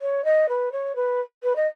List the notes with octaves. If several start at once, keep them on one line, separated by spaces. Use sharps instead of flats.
C#5
D#5
B4
C#5
B4
B4
D#5